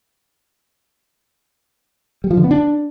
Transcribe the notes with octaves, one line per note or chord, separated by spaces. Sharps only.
G3
F3
D3
B3
D4